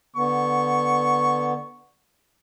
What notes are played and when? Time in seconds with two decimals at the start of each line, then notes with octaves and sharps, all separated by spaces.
0.16 D3 B3 C#6